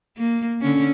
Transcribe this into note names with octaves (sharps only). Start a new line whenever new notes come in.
A#3
D3 C#4